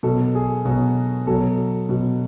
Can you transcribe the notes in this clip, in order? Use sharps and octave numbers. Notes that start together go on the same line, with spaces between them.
B2 F#3 A4
G#4
B2 F#3 F#4
B2 F#3 A4
B2 F#3